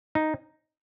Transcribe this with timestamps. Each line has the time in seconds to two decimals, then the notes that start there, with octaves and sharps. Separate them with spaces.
0.15 D#4